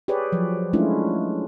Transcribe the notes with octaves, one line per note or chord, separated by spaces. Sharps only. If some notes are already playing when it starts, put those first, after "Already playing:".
G4 G#4 B4 C#5 D5
F3 F#3
G#3 A3 C#4 D4 E4 F4